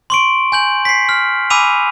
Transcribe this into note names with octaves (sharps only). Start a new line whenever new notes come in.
C6 C#6 D7
G#5 G6 F#7
B6 C7
F6
G#5 B5 D6 E6 D#7 F7